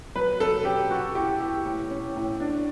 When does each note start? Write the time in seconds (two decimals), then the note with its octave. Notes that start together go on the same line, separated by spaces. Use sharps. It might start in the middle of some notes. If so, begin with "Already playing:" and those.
0.15 F#3 B4
0.40 F#3 A4
0.65 C#4 G4
0.91 F#4 A4
1.15 E4 G4
1.40 E4 G4
1.65 A2
1.90 C#4
2.16 A2
2.40 D4